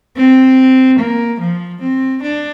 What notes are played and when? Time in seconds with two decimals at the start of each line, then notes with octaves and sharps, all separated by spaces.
0.16 C4
0.99 A#3
1.40 F3
1.81 C4
2.22 D4